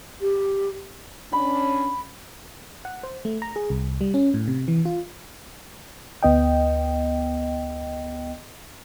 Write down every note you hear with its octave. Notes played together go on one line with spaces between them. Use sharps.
G4
C#4 D4 B5
F#5
C5
A3
A#5
G#4
C2
G3
C#4
A2
C3
E3
F4
D2 B3 D#5 G5